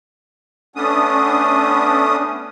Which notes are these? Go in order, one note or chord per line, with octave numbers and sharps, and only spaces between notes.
A3 B3 C#4 D4 D#6